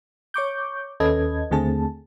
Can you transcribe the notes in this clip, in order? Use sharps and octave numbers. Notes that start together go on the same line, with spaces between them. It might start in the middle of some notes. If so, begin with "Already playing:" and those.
C#5 C#6 D6 G6
D#2 C#4 A4 B4 D#5 G#6
D#2 D3 A3 C4 G#4 A5